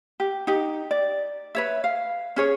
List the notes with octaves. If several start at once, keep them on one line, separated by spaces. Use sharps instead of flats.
G4
D#4 G4
D5
B4 C#5 E5
F5
C#4 G#4 C#5